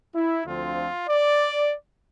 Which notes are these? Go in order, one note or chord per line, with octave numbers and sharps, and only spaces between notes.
E4
D2 D3 F3 C4 F4
D5